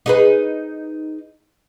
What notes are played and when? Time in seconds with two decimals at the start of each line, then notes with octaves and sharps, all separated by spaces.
0.06 D#4 G#4 B4